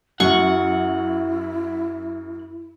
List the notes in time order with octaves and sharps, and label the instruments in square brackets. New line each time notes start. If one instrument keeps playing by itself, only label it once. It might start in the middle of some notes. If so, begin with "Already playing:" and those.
[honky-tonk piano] F#2 [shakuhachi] E4 [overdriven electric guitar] F#5 [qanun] C#6